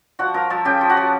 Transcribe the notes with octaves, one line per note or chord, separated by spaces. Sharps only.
F3 F#4 F#5
F3 A#4 A#5
F3 A4 A5
C#3 G4 G5
F3
F#4 F#5
F3